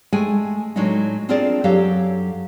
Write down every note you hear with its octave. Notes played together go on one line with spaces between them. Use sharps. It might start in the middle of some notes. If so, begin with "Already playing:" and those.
G#3 A3 G#4 G5 G#5
A2 F#3 G#3 D4 D#4
C4 D4 F4 G#4 A#4 D5
F#2 F#3 G4 A4 C#5 F5